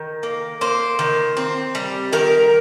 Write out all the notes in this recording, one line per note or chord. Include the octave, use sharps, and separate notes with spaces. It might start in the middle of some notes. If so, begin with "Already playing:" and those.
Already playing: D#3
A#3
A#3 C5
D#3
C4
G3
D#3 A#4